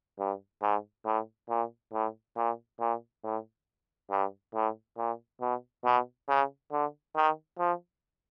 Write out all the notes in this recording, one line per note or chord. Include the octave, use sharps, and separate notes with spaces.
G2
G#2
A2
A#2
A2
A#2
A#2
A2
G2
A2
A#2
B2
B2
C#3
D3
D#3
F3